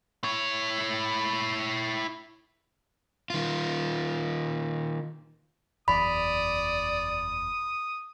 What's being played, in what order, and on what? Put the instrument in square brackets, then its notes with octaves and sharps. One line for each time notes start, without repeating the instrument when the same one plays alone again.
[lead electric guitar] E4 C#5
[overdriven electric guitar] D#3 F4
[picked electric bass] F#1 E2 [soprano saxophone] D5 [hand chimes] B5 [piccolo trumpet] D#6